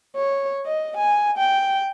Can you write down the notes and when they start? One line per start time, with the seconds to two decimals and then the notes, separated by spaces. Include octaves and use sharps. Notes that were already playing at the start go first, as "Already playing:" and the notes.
0.16 C#5
0.66 D#5
0.97 G#5
1.38 G5